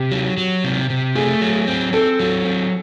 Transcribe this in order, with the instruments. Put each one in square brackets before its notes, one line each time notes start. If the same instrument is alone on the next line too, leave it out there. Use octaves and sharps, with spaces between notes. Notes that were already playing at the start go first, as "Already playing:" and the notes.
Already playing: [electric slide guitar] C3 [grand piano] G4
[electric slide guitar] F#3
F#3
C3
C3
[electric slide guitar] A3 [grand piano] G#4
[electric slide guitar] F#3
C4
[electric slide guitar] C4 [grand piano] A4
[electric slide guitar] F#3
C4